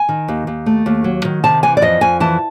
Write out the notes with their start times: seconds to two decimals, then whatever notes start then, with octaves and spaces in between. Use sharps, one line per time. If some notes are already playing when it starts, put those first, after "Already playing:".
Already playing: G#5
0.09 D#3
0.28 D#2
0.47 D#2
0.66 A3
0.86 D#2
1.04 F#3
1.25 D#3
1.44 C3 A5
1.63 E3 G#5
1.77 D5
1.82 F2 D#5
2.01 F2 G#5
2.20 E3 A5